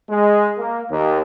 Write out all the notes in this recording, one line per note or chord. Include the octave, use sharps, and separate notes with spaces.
G#3
A#3
D#2